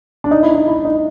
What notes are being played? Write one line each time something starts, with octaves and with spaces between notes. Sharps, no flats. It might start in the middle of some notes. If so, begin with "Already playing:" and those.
D4
D#4
E4
D#4
E4
D#4